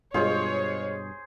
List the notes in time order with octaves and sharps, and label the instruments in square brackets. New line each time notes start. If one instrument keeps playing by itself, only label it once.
[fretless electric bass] G2 B2 [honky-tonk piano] G#3 F4 [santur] G#4 C5 [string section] C#5